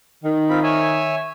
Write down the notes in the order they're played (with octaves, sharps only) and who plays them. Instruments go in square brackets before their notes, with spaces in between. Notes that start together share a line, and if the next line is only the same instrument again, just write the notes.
[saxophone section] D#3
[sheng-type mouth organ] C4 F4 B5
C#5 E5 G#5